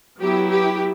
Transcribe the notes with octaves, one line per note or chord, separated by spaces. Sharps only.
F#3 B3 E4 G4
G4